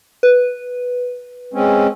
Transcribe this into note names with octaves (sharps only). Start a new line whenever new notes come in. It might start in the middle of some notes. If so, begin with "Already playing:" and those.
B4
G#3 C4 C#4